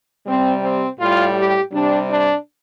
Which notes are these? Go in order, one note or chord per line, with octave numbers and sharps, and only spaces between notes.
C3 G3 C4
C4
A2 G3 F4
G4
C3 G3 D4
D4